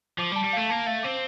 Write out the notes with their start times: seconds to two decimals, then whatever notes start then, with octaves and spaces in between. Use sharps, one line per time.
0.18 F3 D6
0.32 G3
0.36 A5
0.44 G3
0.53 A3 F5
0.69 A#3 A5
0.86 A3 F5
1.03 C4 D6